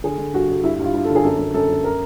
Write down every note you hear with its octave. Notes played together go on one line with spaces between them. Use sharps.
D3 G#4
D3
G2 F#4
D3
G2 E4
G2 F4
G2
A4
D3
G#4
F#2 A4
F#2
F#2 A4
F#2
A#4